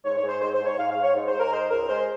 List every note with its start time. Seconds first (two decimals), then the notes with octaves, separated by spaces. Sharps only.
0.04 G#2 C#5
0.17 C#5
0.23 G#2
0.29 C5
0.41 G#2 C5
0.54 C5
0.60 G#2
0.66 C#5
0.78 G#2 F5
0.91 F5
0.96 G#2
1.03 C#5
1.15 G#2
1.28 C5
1.34 G#2
1.40 A#4
1.52 G#3 C5
1.70 C#2 A#4
1.89 G#3 C5